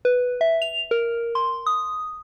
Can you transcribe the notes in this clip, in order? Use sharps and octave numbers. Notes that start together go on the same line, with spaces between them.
B4
E5
F7
A#4
C6
D#6